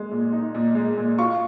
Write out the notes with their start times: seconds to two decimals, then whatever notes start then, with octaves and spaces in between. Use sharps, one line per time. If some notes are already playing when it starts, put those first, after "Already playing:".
Already playing: G#3
0.11 A#2
0.33 D#4
0.55 A#2
0.75 G#3
0.98 A#2
1.19 F4 C#6